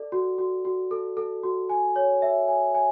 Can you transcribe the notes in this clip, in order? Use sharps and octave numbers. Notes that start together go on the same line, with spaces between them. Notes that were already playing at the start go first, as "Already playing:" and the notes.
Already playing: A4 D5
F#4
F#4
F#4
A4
A4
F#4
G#5
C#5
E5
G#5
G#5